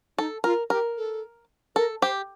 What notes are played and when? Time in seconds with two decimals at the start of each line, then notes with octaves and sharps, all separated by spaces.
0.18 D#4 A4
0.44 F4 A#4
0.70 G4 A#4
0.97 A4
1.76 A4 A#4
2.02 G4 C5